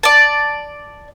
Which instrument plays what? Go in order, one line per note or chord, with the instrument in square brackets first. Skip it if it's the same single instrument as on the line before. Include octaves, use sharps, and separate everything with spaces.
[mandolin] D5 A5